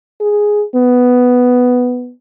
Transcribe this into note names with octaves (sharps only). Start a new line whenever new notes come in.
G#4
B3